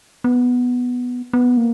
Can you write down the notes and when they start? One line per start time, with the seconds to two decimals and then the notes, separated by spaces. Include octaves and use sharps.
0.24 B3
1.33 B3
1.57 A#3